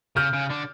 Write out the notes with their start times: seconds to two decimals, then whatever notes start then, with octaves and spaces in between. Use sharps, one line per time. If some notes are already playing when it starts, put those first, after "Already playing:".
0.16 C#3 F6 G6
0.33 C#3
0.50 D3